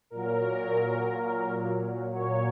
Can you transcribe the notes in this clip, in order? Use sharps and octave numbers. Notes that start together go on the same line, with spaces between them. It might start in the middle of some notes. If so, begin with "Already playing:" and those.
A#2 F#3 A#4
A#2 F#3 C#5